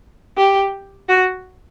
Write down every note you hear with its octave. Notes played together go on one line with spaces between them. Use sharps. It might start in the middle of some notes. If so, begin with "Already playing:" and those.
G4
F#4